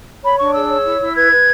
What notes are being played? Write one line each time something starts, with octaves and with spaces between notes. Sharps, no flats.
C#5 B5
D4 C#6
G#4 E6
C#5
E4
E4
B4 G#6
B4